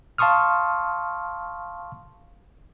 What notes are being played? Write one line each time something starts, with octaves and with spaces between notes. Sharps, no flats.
F5 A5 C6 C#6 D#6 F6